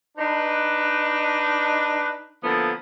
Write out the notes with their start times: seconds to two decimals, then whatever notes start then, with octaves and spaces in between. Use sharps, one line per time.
0.18 D4 D#4 B4
2.43 D3 F3 A#3 B3 E4 A4